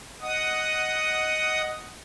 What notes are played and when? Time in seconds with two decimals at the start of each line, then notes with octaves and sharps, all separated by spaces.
0.21 D#5 F#5 D#6